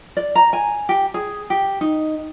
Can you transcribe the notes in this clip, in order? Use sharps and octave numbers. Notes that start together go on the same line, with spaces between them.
D5
A#5
G#5
G4
G#4
G4
D#4